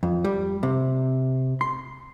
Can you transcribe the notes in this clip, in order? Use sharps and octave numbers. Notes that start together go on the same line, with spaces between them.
F2
G3
C3
C6